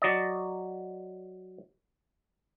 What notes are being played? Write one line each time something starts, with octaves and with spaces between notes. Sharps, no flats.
F#3 D5 D#5